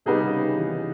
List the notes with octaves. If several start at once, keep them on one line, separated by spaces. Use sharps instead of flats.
C3 G3 B3 D#4 G#4
C#3
D#3
E3